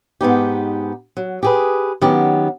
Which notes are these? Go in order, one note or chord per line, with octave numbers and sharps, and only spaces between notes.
G#2 B3 D#4 G4
F#3
G4 G#4 B4
D#3 F#3 B3 C#4 G4